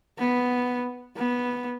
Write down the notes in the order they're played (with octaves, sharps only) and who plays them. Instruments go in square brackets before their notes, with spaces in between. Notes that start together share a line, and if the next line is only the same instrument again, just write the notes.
[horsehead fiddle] B3
B3